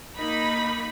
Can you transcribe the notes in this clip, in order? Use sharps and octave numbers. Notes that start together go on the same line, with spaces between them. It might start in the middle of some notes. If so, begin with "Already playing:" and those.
A#3 D#4 B5